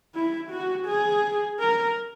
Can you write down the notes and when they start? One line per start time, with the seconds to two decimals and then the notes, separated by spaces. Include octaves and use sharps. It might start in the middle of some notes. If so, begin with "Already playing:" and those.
0.15 E4
0.50 F#4
0.87 G#4
1.60 A#4